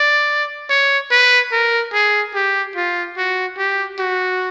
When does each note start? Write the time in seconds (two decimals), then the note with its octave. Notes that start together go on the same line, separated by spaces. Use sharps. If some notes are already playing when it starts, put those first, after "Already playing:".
Already playing: D5
0.69 C#5
1.11 B4
1.52 A#4
1.93 G#4
2.35 G4
2.76 F4
3.17 F#4
3.58 G4
3.99 F#4